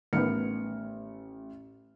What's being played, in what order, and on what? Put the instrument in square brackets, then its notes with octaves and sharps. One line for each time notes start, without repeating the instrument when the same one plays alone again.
[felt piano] A1 F6 C#7 [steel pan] D#3 B3